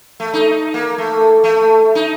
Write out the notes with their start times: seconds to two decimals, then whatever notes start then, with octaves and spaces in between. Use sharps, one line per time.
0.20 A3
0.34 D#4
0.74 A#3
0.98 A3
1.44 A3
1.95 D#4